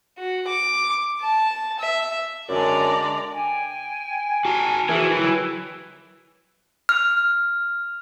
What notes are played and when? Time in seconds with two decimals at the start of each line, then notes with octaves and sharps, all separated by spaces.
0.18 F#4
0.47 D6
1.22 A5
1.79 E5
2.49 F#2 D3 G#3 D4 D5 A#5
3.33 G5 G#5
4.45 F#4 A5 A#5
4.89 E3 F#4 G#4 A#4
5.12 F#3 E4
6.89 F6